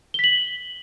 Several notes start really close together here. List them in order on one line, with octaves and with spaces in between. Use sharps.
G7 B6 F#7